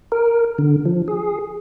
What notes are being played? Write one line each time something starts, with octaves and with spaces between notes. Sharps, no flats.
A#4
D3
F3
G#4